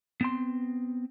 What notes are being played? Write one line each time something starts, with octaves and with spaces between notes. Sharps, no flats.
B3 C4 C6